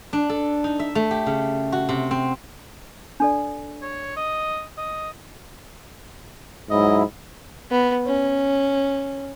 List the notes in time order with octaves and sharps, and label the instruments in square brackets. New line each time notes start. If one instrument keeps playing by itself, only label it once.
[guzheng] D4
A4
D#4
E5
A3
G4
C#3
F#4
C3
C4
[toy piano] D4 A4 D5
[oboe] C#5
D#5
D#5
[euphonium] G#2 [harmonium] F#3 E4 [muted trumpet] D#5
[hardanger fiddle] B3
C#4